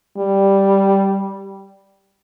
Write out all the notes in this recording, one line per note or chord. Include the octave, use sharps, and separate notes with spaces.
G3